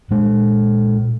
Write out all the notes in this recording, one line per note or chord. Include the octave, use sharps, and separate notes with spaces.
A#2 G#3